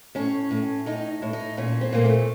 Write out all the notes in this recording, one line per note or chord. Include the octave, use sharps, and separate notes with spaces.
A2 C#4
A2
A2 D#4
A2
D#4
A#2 C#4
C4
A#2 A#3
A3